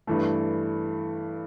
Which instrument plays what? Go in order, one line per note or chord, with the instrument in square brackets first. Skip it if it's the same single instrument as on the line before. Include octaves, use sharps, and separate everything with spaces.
[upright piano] G2 E3 A3